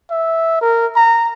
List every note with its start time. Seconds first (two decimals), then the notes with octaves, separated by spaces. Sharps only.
0.11 E5
0.61 A#4
0.96 A#5